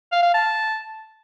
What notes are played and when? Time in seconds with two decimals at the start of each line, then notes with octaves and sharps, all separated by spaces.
0.12 F5
0.23 F5
0.34 A5